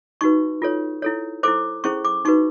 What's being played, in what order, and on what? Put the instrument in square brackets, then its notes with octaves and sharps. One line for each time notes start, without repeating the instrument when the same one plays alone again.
[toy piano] D#4 F#4 B4 C#6
F4 A4 C#5
E4 A4 C#5
E4 A4 C5 D6
C#4 E4 G#4 C5 C#6
D6
D#4 F#4 B4 C#6